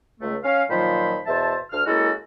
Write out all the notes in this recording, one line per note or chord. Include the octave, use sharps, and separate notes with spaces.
C#2 A3
C#4 F5
A#2 D#3 F3 F#3 C5 B5
E2 B2 C5 E5 A5
D2 F6
G#3 A#3 C#4 E4 F#4 A4